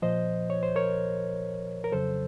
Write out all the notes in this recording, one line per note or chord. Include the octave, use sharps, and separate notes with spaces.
A#2 F3 C5 D#5
C#5
C5
A#4 C#5
A#4
F2 C#3 F#3 A4 C5